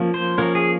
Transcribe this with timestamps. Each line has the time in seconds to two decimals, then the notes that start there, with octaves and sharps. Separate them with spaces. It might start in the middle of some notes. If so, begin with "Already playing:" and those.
Already playing: F3 A#3 C#4
0.14 C5
0.38 F3 A#3 C#4 A#4
0.55 G#4